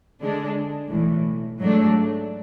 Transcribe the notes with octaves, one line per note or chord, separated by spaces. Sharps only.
D3 G#3 D4
B1 A2 E3
G#2 F#3 A3 D4